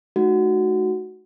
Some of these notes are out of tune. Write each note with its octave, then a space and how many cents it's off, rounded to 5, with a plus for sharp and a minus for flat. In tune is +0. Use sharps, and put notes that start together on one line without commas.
A3 -45 D#4 -5 F#4 +0